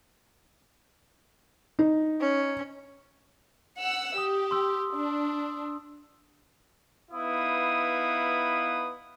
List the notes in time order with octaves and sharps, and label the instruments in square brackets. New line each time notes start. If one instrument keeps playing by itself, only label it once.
[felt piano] D#4
[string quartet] C#4
[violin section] F#5 E6
[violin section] G4 [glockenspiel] D#6
[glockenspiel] C6 E6
[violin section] D4
[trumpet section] B3 D#4 E4 B4 F5 D#6